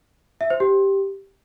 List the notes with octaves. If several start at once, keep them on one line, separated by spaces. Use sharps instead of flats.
E5
C5
G4